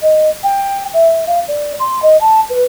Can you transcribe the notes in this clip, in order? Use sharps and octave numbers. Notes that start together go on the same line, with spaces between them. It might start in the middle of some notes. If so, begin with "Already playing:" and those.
D#5
G5
E5
F5
D5
C6
D#5
A5
B4